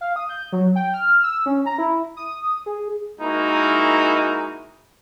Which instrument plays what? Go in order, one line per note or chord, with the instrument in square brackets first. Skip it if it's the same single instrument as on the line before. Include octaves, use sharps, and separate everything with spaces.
[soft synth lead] F5
D#6
G6
F#3
G5
F6
E6
C#4
A#5
E4
D#6
G#4
[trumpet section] G#3 A#3 D#4 E4 F#4 A#4